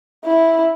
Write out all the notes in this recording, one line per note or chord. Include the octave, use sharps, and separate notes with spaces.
E4